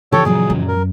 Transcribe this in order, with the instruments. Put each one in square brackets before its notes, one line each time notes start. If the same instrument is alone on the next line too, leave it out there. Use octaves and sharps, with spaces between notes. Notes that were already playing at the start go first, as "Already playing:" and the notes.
[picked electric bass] C#3 E3 F3 [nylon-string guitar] G4 [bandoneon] A4 C#5
[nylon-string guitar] A#2 F#3 A#3 [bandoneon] G#4
[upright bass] F#2
[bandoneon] A#4